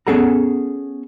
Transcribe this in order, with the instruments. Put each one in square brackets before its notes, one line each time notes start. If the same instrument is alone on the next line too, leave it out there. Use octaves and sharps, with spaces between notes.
[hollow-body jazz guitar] B3 C#4 G#4 A4 F#5 A#5